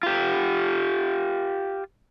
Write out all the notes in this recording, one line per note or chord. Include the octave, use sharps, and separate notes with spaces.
F4 G4